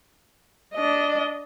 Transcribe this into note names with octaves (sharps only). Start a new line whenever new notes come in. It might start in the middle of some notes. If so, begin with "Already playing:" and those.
D4 D#5